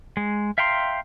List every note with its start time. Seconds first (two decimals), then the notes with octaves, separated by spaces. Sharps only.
0.17 G#3
0.58 E5 F5 G5 A#5 C6